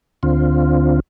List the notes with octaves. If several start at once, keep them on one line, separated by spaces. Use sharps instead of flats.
D2 D3 C4 F4